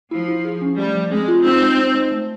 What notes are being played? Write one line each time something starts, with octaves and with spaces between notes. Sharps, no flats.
F3 E4
E4
G#4
C#4
G3 A3
F3
G#3 C4
F4
C4 D#4
G#3
D#4
G#3
A3